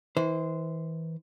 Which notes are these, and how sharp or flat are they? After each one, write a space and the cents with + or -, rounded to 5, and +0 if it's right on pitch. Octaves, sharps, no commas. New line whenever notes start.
E3 -35 C5 -20